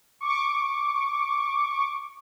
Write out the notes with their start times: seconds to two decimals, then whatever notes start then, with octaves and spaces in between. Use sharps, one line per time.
0.21 C#6 D6